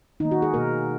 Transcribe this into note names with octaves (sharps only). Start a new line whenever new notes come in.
D#3 A#3 D#4
F#4
G#4
B2 A#3 A#4